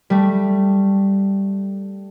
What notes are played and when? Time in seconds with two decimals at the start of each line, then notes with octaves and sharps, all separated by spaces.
0.10 G3 A3